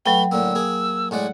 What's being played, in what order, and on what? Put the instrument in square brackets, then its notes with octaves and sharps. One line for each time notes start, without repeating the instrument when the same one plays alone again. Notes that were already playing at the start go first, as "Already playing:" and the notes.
[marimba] F#3 G5 [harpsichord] A3 B4 [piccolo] G7
[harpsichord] A2 D3 A#3 [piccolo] E6
[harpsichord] A#3 G#4
[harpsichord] A2 G#3 D5 [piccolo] F#5